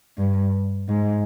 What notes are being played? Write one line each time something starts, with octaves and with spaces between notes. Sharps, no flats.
G2
G#2